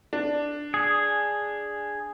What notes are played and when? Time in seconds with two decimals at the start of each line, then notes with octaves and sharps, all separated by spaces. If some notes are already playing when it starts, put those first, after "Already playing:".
0.13 D4
0.74 G#4